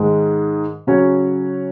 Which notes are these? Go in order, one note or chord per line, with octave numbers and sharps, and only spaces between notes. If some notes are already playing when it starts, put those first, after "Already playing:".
Already playing: G#2 D#3 G#3 D#4
C#3 F#3 C#4 F#4 C#5